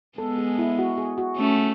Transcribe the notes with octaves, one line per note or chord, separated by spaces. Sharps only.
G#3 B3 A4
G#4
E4
F#4
G#4
F#4
A3 C#4